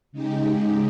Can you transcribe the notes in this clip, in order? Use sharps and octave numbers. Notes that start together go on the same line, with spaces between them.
C#3 G#3 D#4 G4